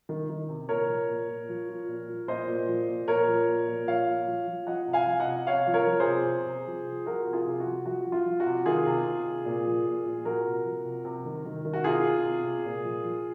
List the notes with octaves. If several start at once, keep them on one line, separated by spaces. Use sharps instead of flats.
D#3
D#3
C3
A#2 A#4 C#5
F3
A#2
A#2
F3
F3
A#2
F3
A#2 C5 D#5
A#2
F3
A#2
A#2 A#4 C#5
F3
A#2
A#2
F3 C#5 F5
A#2
F3
F3
F3 D#5 F#5
C3
F5 G#5
F3
D#5 F#5
C3
C3 C#5 F5
F3
A#4 C#5
F3
G#4 C5
C3
C3
C3
F3
F3
F3 F#4 A#4
C3
F4 G#4
C3
F#4
F3
F3 F#4
F3
F4
F3
F#4
C3
D#3 F4 G#4
C3
C3
C3
A#2
F3
A#2
A#2
F3 F#4 A#4
C3
F3
C3
C3
D#3
D#3
D#3
F#4
C3 F4 G#4
C3
C3
C3
A#2
F3
F3